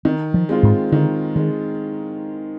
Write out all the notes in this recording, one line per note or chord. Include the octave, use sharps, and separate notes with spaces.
D#3 C4
F3
G#3 C4 F4
G#2
D3 D#3
D#3 G#3